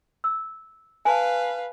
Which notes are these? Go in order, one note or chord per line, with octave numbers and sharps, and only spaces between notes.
E6
B4 F5 G#5 A5